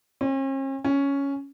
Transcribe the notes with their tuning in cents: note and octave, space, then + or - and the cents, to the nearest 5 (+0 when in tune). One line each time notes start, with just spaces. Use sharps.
C#4 -45
C#4 +5